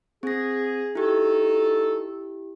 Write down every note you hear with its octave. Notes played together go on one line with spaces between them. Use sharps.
C4 G#4 A#6
D#4 E4 F#4 G4 A4